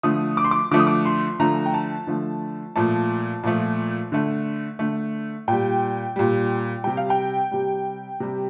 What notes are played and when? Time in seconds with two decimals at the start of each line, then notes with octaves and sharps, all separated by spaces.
0.03 D3 F3 A3 D#6
0.37 D6
0.45 C6
0.51 D6
0.71 D3 F3 A3 D6
0.80 D#6
0.87 D6
1.05 C6
1.40 D3 F3 A3 A#5
1.66 G5
1.74 A5
2.07 D3 F3 A3
2.76 A#2 F3 A3 A5
3.43 A#2 F3 A3
4.12 D3 A3
4.79 D3 A3
5.48 A#2 G3 G5
6.16 A#2 G3
6.84 C3 G3 G5
6.97 F5
7.10 G5
7.51 C3 G3
8.20 C3 G3